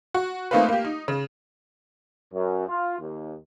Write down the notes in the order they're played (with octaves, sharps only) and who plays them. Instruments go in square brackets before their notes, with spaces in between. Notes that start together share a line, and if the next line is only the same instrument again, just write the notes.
[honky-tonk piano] F#4
A3 A#3 C4 D#4 F4 B4
A#3 G4
D#4
C#3
[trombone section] F#2
F4
D#2